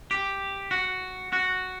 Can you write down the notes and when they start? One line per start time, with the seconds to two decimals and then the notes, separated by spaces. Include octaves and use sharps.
0.11 G4
0.71 F#4
1.33 F#4